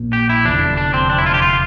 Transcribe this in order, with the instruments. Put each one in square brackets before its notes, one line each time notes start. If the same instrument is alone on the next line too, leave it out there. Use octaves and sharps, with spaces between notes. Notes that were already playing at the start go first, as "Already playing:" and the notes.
Already playing: [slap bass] A#1 A#2 F3 A#3
[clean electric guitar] G4
E4
[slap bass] F1 E2 D3 F3 [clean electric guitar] D4
[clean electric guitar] D4
C4
D4
E4
F4
G4
F4